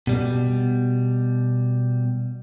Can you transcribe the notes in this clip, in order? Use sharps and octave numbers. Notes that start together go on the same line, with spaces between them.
B2 G3